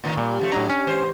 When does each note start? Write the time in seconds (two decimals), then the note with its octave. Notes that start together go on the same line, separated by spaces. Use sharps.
0.04 A2 D3 D#3
0.17 A#2 G3
0.40 C#3 F3 A3
0.52 A2 F#3 D4 G4 C#5 A#5
0.70 C#4
0.87 G#2 E3 C5